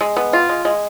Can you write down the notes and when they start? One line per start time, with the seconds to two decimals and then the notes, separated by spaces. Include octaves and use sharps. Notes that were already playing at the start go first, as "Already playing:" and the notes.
0.01 G#3
0.17 B3
0.33 F4
0.49 G#3
0.65 G#3